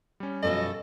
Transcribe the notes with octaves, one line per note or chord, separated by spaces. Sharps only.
G3 C#4
F#2 B2 F3 A4 D#5